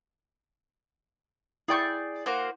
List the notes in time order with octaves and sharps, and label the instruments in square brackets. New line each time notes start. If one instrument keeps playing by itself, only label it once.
[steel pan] E4 G5 C#6 [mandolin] G#4 D5 G6
[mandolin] A#3 F#4 C5